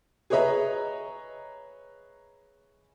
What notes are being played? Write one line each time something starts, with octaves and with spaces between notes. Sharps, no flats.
G#4 B4 C#5 D#5 E5 A#5